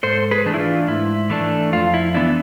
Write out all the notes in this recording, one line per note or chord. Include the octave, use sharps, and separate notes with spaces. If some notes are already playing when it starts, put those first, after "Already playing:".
G#2 A4 C5
G#4 B4
E3 A3 D4
E4
F4
G#2 E4
E3 A3 D4
F2 F4
E4
E3 B3 D4 E4